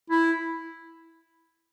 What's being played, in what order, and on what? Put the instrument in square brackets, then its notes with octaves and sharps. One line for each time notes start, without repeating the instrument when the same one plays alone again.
[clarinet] E4